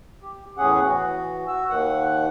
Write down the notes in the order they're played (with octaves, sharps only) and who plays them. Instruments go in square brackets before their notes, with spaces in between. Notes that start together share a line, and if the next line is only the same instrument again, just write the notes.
[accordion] G4
E2 A2 C#4 G#4 F#5
E3 F#4
F#4 E6
D#2 D#3 F#5